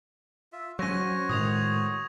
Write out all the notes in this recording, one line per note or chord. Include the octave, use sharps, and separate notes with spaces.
F4 E5
F#3 C#4 F#4 C5 C#5 C#6 A#6 D#7
A2 D#3 G#3 D#6 G#6 F7